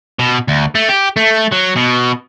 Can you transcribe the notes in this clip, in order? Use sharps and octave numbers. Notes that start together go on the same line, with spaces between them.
B2
D2
A3
G4
A3
F#3
B2